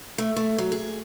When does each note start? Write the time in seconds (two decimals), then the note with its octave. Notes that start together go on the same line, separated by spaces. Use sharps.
0.18 A3
0.36 A3
0.58 F#3
0.72 G#4